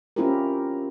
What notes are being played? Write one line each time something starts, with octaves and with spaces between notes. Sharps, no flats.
C4 C#4 E4 F4 G4 A#4